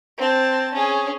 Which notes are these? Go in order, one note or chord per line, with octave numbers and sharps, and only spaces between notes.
C4 A5
C#4 G#4